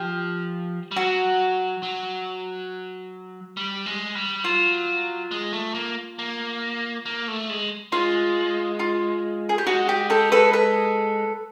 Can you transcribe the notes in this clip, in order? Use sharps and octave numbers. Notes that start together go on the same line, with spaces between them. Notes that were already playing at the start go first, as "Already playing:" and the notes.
Already playing: F3 G4
G3
F#3 F#4
F#3
G3
G#3
G3
F#3 F4
G#3
A3
A#3
A#3
A#3
A3
G#3
G#3 F4
F4
G#4
G4
G#3 F#4
G4
G4 A4
A4 B4
A4 B4